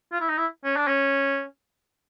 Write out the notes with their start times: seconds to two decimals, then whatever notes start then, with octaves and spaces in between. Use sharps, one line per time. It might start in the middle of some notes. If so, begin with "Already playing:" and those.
0.12 F4
0.21 E4
0.29 D#4
0.38 E4
0.64 C#4
0.76 D4
0.88 C#4